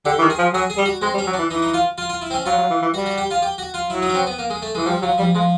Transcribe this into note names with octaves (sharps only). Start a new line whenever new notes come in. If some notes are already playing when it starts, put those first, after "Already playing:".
D3 G4
E3
D#3
G#4
F3
F#3 G#4
G#4
G3
F#4
G#3 C4
G3
C#4
F#3
D4
E3
E3 D#4
D#4
F4
F4
F4
E4
C4
C#4
F#3 F4
F#3
E3
E3
G3 F#4
F#4
G4
F4
G4
F#4
F4
F#3 E4
D#4
C#4
C4
B3
A#3
G#3
A3
E3 G#3
F3 G3
F3 F#3
F3 G3
F3 G#3